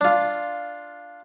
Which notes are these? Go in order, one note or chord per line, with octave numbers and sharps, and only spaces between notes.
D4 F4